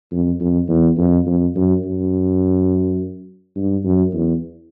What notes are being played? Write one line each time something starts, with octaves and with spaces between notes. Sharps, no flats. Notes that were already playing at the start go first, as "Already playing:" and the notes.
F2
F2
E2
F2
F2
F#2
F#2
G2
F#2
E2